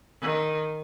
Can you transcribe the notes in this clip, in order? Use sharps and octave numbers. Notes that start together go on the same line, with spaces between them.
D#3